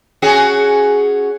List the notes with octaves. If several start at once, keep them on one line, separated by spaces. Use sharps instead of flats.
C#4 F#4 G#4